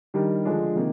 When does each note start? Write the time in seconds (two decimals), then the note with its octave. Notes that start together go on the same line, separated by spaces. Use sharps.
0.14 D#3 G3 D4 G4 A#4
0.45 D3 F3 G#3 D4
0.76 C3 D#3 A#3